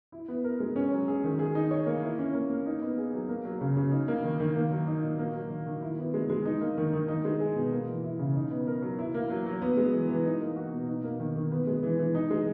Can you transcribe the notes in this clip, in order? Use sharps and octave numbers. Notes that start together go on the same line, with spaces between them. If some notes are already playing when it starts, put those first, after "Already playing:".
E4
B3
A#4
G#3
C#4
F#3
G#4
D#3
G#4
D#4
C#5
A#3
E4
C#4
A#3
A#3
D#4
B3
G#4
F#3
A#3
F#3
C#3
C#3
D#4
A#3
D#3
D#3
A#3
F#3
D#4
A#2
A#3
F#3
D#3
D#3
E4
B3
G#3
G#3
D#4
A#3
D#3
D#3
D#4
G#3
G#4
B2
A#3
E3
E4
C#3
D#4
B3
A#4
F#3
E4
A#3
F#3
F#3
B3
G#3
E3
E3
D#4
A#3
F#4
B2
D#4
A#3
D#3
D#3
B3
G#3
E3
E3
D#4
G#3